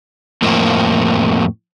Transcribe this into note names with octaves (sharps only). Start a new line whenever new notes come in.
F2 A2 A#3 C4